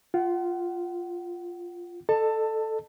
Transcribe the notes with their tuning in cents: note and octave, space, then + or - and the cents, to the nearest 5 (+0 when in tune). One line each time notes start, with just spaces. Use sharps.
F4 +0 F#5 +35
A4 +0 D#5 -40 A5 +20